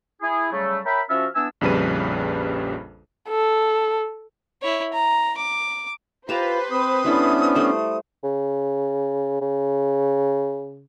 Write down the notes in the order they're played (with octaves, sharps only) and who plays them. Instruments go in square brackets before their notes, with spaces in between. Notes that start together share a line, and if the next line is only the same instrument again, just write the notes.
[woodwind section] E4 G#4
C#3 F#3 G3 A3
A#4 C#5 E5 G5 B5
F3 C#4 F#4 A4 E5 F6
E3 B3 D4 G#5 E6
[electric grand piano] A#1 F2 C#3 G3 B4 D#7
[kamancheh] A4
[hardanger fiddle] E4 C#5
A#5
D6
[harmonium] F4 [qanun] G4 A5 A#5 [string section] B4 C5
[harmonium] C4 [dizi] D#6
[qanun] G3 E4 A4 [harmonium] B3 C#4 D4
[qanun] G3 A3 C5
[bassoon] C#3
C#3